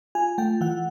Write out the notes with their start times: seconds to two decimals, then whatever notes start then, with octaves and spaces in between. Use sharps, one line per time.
0.15 F4 G#5
0.38 A3 G5
0.61 E3 F#5